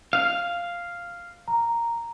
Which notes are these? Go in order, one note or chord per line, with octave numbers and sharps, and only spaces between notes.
F5
A#5